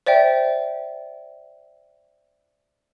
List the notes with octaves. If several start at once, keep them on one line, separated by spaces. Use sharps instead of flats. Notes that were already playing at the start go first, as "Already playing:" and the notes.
C5 D5 E5 G5